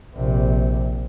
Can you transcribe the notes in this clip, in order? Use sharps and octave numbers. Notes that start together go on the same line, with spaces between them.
A#1 C3